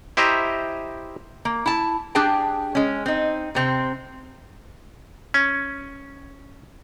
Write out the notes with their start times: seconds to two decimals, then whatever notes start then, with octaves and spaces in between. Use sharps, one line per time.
0.17 E4 G4 C5 D#5 E5 A#5
1.45 A#3
1.66 E4 A5
2.15 D4 G4 G#4 G5 A5
2.75 G#3 C#4
3.06 C4 D#4
3.55 C3 C4
5.34 C#4